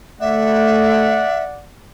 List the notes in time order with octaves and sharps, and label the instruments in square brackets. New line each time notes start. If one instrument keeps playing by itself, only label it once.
[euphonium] A3 [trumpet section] D5 F#5 [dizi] E5